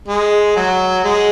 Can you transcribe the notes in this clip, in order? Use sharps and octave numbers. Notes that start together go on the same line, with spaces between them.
G#3
F#3
G#3